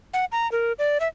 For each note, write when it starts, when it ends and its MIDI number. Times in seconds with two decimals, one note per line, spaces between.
0.14 0.25 78
0.32 0.50 82
0.52 0.73 70
0.79 0.98 74
1.00 1.08 76